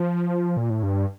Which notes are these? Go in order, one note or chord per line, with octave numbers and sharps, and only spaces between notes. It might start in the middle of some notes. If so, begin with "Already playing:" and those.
Already playing: F3
A#2
A2
G2